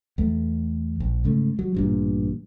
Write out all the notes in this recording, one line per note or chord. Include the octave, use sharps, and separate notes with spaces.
E2 A3
A#1
G#2 C#3 A3
F#3
A1 G2 A#2